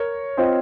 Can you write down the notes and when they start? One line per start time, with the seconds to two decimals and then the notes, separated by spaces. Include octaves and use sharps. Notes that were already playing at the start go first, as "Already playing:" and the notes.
Already playing: A#4 C#5
0.37 C4 F4 C5 D#5